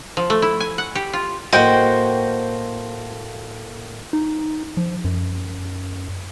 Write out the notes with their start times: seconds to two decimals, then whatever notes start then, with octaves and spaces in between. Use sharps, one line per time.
0.17 F3
0.30 A3
0.42 E4
0.60 G#5
0.78 F#5
0.95 G4
1.13 F4
1.53 A2 A#3 F#4 C5 D#5 G5
4.13 D#4
4.77 F3
5.05 F#2